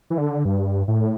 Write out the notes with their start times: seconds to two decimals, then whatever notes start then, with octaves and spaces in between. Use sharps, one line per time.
0.10 E3
0.18 D3
0.45 G2
0.88 A2